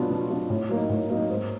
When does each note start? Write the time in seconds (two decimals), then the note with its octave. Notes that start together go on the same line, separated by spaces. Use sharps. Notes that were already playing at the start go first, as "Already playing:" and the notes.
Already playing: B2 F#3 B3 D4 F4
0.10 B2
0.29 F#3 B3 D4 F4
0.50 A2
0.69 F#3 A#3 D#4
0.89 A2
1.09 F#3 A#3 D#4
1.29 G#2